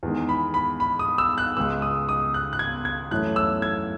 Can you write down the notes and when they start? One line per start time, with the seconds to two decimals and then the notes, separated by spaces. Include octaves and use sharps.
0.03 E2 D#3 G#3
0.29 B5
0.54 B5
0.80 B5
0.99 D#6
1.18 E6
1.38 F#6
1.57 C#2 C#3 G#3 E6
1.82 D#6
2.09 D#6
2.34 F#6
2.53 F#6
2.59 G#6
2.85 G#6
3.11 F#2 E3 A3 C#4 E4 F#6
3.36 E6
3.62 G#6